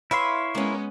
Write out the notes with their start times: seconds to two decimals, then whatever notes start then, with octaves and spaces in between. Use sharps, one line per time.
0.11 E4 B4 C#5 E5 F5 C6
0.55 G#3 A#3 B3 C#4 C#5